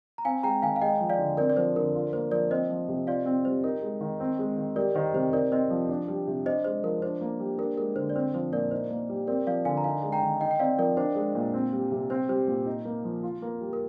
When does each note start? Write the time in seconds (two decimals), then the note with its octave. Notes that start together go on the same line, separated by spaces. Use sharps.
0.18 A#5
0.25 C4 F5 G#5
0.43 G#3 G5 A#5
0.62 D#3 F5 G#5
0.76 F5
0.81 G#3 D#5 G5
1.00 F3
1.09 D5 F5
1.19 D3
1.37 C4 A#4 D5
1.50 D5
1.57 F3 C5
1.76 D3 A#4
1.95 F4
2.13 A#3 C5
2.32 F3 A#4 D5
2.51 C4 C5 D#5
2.70 F3
2.89 C3
3.07 F4 D5 F5
3.26 C4
3.45 G3 C5
3.64 D#4 A#4
3.83 G#3
4.01 D#3
4.20 C4
4.39 G#3
4.57 D#3
4.76 G3 A#4 D5
4.95 D#3 C5
5.14 C3 C5
5.33 D#4 A#4 D5
5.52 C4 C5 D#5
5.70 F3
5.89 D4
6.08 G3
6.28 C3
6.46 D4 C5 D#5
6.64 G#3 C5
6.84 F3 A#4
7.02 D4 C5
7.21 A#3
7.40 G3
7.58 D4 A#4
7.77 G#3 A#4
7.96 D3 C5
8.10 D5
8.15 C4 C5
8.34 F3 C5
8.52 A#2 A#4 D5
8.71 D#4 C5
8.91 A#3
9.09 G3
9.27 C4 A#4 D5
9.47 F3 D5 F5
9.65 D3 F5 G#5
9.77 A#5
9.84 D#4 F5 G#5
10.03 G#3
10.13 G5 A#5
10.22 D#3
10.41 D#4 D#5 G5
10.51 G5
10.59 C4 D5 F5
10.78 F3 A#4 D5
10.97 D4 C5
11.15 G#3
11.35 A#2
11.54 C4
11.73 G3
11.92 C3
12.10 C4 C5
12.29 G3 C5
12.48 A#2
12.66 D#4
12.85 A#3
13.04 F3
13.23 F4
13.42 A#3
13.61 G3
13.73 A#4